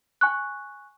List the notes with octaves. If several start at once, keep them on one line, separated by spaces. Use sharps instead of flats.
G#5 C#6 F#6